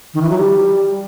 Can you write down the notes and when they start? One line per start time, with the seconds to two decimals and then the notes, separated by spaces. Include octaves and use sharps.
0.14 D#3
0.22 E3
0.30 F#3
0.38 G3